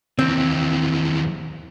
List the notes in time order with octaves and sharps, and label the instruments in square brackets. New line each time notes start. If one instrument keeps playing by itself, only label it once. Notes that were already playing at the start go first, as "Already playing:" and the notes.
[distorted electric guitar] D#2 E3 [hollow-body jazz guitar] C4